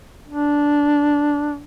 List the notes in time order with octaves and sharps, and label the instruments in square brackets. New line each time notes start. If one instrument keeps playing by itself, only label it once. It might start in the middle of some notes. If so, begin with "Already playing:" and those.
[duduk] D4